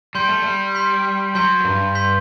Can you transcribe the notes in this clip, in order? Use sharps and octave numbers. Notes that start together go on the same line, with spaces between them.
G3 C6 G6 B6
A3
G3
C6 G6 B6
F#3 C6 G6 B6
F#2
G2
C6 G6 B6